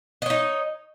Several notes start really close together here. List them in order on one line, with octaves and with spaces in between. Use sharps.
D#5 C#5 D#4